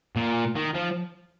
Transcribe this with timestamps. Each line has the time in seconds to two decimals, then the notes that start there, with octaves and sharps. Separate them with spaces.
0.16 A#2
0.56 D#3
0.74 F3